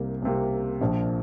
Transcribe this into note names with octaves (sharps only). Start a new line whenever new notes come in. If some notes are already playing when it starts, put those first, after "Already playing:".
Already playing: C2 C3 A#3
C2 C3 A#3
A#1 A#2 F3